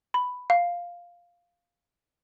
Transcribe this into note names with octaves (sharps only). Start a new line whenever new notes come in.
B5
F5